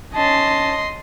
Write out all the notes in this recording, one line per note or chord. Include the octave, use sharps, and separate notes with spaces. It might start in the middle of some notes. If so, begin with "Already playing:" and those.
C#4 D#5 A5 C6